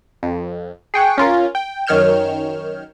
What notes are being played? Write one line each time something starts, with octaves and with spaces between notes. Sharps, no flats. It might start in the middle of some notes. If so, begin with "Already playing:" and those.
F2
G#4 G5 C#6 F#6
C#4 F4 A#4
G5
F#2 D#3 C#5 F6 G6 E7